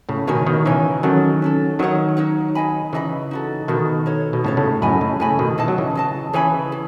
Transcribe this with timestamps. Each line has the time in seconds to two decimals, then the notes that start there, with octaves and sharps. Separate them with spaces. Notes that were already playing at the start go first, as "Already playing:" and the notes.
0.09 A2 C#3
0.27 B2 D#3 D#4 F#4 C#5 G#5
0.46 B2 D#3
0.65 C#3 E3 D#4 F#4 C#5 G#5
1.03 D#3 F#3 C#4 F#4 A4
1.42 C#4 F#4 A4
1.79 D#3 F#3 D#4 F#4 C#5 F#5
2.17 D#4 F#4 C#5 F#5
2.55 G#4 D#5 G#5 B5
2.93 C#3 E3 G#4 D#5 G#5 B5
3.31 D#4 F#4 A4
3.68 B2 D#3 D#4 F#4 A4
4.06 D#4 A4 C#5
4.33 B2
4.44 A2 C#3 D#4 A4 C#5
4.57 A2 C#3
4.82 F#2 A2 A4 D#5 G#5 B5
5.01 A2 C#3
5.20 A2 C#3 A4 D#5 G#5 B5
5.39 B2 D#3
5.58 E3 G#4 D#5 A5
5.68 F#3
5.78 C#3 E3
5.95 G#4 D#5 A5
6.33 C#3 E3 G#4 C#5 G#5 B5
6.72 G#4